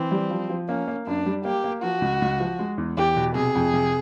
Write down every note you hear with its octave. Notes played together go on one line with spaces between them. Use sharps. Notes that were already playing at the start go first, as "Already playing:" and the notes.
Already playing: E3 C4
G3
F3
F3
A#3 C#4
A#3
F#2 D4
G3
A#3 G4
A#3
F3 F#4
C#2
C#2
F3
G#3
E2
E2 G4
B2
C3 G#4
F2
C3